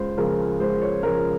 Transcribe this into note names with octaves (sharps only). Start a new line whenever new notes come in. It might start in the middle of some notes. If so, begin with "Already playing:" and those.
Already playing: C#2 C5
C#3 F3 G#3 A#4
C#2 C5
C#5
C#3 F3 G#3 A#4